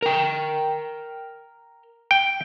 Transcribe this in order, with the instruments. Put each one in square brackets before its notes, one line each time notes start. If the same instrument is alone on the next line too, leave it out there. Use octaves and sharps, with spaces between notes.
[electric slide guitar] A#4 G5
[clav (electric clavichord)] G5